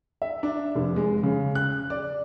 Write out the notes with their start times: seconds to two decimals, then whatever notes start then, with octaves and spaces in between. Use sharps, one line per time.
0.22 E5
0.43 D4
0.75 F1
0.96 G#3
1.23 C#3
1.55 F#6
1.90 D5